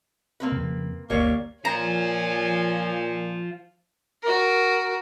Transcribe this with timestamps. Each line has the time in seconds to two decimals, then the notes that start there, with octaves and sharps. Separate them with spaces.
0.40 A#3 C4 B4
0.52 F2 C#3
1.10 G1 D2 G3 A#3 C#5
1.65 A#2 F4 C5 C#5 G#5 A#5
4.22 F#4 A#4